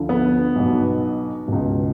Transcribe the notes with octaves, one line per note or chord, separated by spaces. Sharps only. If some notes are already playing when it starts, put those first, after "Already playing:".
Already playing: D2 D3 F3
B3
B1 B2
C#2 B2